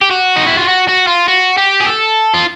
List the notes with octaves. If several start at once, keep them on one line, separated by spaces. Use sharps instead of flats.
G4
F#4
D#4
E4
F4
F#4
F#4
F4
F#4
G4
G#4
A4
F4